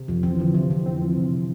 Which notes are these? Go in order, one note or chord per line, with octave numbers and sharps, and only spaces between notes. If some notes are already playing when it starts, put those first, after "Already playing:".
Already playing: C3
F2 F3
E3 C4
D3 F3
C3 E3
F2 E3
C4
F3
C3
C3